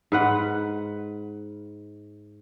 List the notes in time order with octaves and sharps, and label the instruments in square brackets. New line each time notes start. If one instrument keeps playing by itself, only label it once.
[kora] G#2 B4 F#5